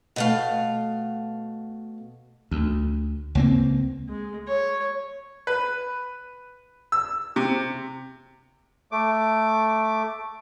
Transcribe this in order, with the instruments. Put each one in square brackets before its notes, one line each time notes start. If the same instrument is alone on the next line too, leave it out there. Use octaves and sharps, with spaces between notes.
[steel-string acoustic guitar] B2 A3 F5
[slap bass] D2
C#2 A#3 C4
[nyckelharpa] G#3
C#5
[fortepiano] B4
E6
C3
[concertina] A3 D6